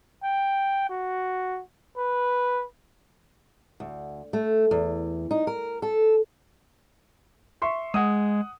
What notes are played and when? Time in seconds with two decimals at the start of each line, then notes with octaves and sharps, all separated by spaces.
0.23 G5
0.89 F#4
1.97 B4
3.80 D2
4.33 A3
4.71 E2
5.31 D#4
5.47 A#4
5.82 A4
7.62 E5 C6 C#6
7.94 G#3 F#5 D#6